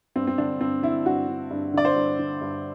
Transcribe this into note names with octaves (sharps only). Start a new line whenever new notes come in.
G2 C4
C4
D3 D4
G2 C4
D3 E4
G2 F#4
D3
G2
D3 D5
C5
G2
D3
G2